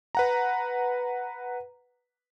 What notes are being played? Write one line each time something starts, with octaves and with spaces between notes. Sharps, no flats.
B4 F#5 A#5